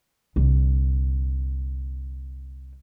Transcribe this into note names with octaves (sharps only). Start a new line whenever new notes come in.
C2 D3